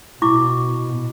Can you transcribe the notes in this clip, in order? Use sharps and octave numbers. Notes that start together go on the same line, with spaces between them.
B2 E4 C#6 D6